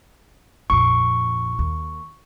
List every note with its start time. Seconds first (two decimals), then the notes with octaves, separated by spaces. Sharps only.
0.70 A#1 F2 C#6
1.59 D#2